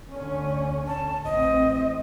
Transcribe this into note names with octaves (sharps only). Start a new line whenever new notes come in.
D2 D3 C#4
A5
A1 C4 D#5